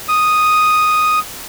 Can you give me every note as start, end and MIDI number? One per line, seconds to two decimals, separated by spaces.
0.08 1.19 87